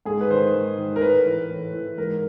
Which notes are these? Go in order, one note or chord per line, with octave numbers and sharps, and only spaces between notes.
G#2 G#4
B4
D#3 C5
G#2
D#3
A#4
A2 B4
E3
A2
E3
G#2 A#4